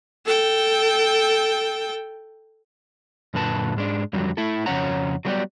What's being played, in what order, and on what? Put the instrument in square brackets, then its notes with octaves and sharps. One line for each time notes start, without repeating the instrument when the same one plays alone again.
[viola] A4 G5
[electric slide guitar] F#2 A#2 D3 B4 A5
G#2 G#3 D4
F2 D3 F#3 G3
A3 E4 A4
F2 C#3 C#4 C#5 F#5 A#5
F#3 G3 A3 B3 G4 D5